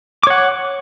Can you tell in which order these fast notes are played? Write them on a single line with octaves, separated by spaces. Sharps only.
D6 C#5 F#5